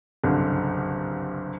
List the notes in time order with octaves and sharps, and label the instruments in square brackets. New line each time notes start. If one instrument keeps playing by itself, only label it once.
[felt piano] F#1 C2 G2 D3